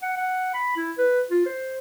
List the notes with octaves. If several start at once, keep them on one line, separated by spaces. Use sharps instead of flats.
F#5
F#5
B5
E4
B4
F4
C5